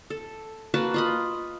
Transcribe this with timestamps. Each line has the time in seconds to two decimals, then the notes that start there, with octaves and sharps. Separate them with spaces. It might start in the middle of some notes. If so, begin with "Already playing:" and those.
0.10 A4
0.74 A#3 F#4 B4 A5
0.94 F4 D#5 B5